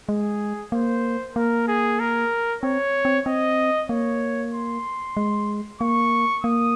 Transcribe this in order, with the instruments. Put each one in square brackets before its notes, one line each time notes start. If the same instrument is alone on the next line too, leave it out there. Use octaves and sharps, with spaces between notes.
[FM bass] G#3 [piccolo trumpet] G#4
[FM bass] A#3 [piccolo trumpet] C5
[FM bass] A#3 [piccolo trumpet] A#4
[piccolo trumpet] G#4
A#4
[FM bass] C4 [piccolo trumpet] C#5
[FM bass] C4
[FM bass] C4 [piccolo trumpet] D#5
[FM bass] A#3 [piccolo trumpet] C#5
[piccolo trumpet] C6
[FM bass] G#3
[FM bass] A#3 [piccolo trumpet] C#6
[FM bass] A#3 [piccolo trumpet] D#6